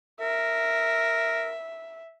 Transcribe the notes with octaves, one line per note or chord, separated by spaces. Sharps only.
A#4 E5